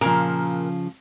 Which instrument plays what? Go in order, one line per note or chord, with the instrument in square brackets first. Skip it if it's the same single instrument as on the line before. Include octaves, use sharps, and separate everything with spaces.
[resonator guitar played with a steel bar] A#2 A#4 [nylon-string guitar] C#3 F3